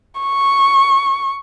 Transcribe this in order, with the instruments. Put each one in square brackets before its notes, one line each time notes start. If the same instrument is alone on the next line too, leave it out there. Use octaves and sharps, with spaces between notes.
[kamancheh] C#6